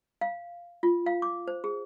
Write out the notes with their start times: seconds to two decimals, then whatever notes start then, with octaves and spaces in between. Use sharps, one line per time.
0.21 F5
0.83 F4
1.06 F5
1.22 D6
1.48 C5
1.64 G#4